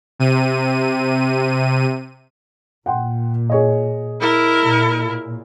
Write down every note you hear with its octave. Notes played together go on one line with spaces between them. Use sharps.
C3 D#7
A#2 F#5 G5 C6
G#4 C#5 D#5
E4 A#4
A#2